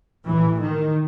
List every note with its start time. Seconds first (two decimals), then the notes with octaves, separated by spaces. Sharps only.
0.26 A1 A2 E3
0.60 D#3